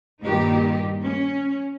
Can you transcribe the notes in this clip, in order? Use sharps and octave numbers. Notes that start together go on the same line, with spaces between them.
G2 A#2 D#3 D#4 G4
C#4